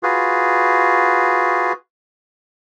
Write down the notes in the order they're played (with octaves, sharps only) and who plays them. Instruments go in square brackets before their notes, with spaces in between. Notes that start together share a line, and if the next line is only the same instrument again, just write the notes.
[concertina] F4 F#4 G#4 B4